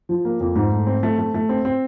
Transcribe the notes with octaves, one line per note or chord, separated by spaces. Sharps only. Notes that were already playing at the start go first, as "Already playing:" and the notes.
F3
A#3
F2
G#2
A3
C4
A3
A3
A3
C4
C4